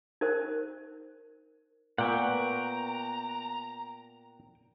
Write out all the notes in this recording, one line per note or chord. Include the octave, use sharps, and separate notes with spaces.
D#4 A#4 C5
A#2 B3 F#5 G5 A#5 C#6